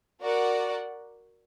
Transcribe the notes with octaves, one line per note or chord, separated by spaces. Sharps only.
F#4 A#4 D5 F#5